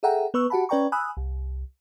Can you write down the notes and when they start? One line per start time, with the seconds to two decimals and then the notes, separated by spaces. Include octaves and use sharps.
0.03 G#4 A4 E5 F#5 G5 A#5
0.34 B3 B4 C#6 E6
0.50 F#4 G4 F#5 A5 B5
0.69 C#4 B4 D5 G5 A#5 C#6
0.92 G#5 B5 D#6 E6 F#6
1.17 C2